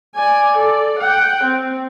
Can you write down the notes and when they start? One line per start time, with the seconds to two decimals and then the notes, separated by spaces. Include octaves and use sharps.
0.15 D5 G#5
0.56 A4 D5
1.00 F#5 G5
1.44 C4